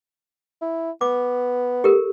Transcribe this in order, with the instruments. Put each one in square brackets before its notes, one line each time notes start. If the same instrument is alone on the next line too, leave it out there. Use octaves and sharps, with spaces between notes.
[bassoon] E4
[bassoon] B3 [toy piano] D6
[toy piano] G4 A4 A#4